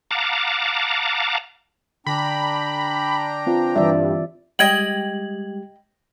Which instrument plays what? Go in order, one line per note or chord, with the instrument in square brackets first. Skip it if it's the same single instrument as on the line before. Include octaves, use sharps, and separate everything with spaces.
[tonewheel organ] F5 F#5 A5 A#5 D6
[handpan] D3 [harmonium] D4 G5 A#5 [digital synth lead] B5
[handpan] C4 F4 B4
[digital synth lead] G2 [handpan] E3 D5 E5
[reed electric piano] G3 G#3 G4 [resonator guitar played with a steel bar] D#5 G5 [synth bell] G#6 F#7